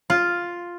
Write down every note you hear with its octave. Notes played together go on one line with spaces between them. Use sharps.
F4